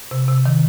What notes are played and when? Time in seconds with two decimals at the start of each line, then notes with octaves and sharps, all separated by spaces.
0.11 C3
0.28 C3
0.46 D#3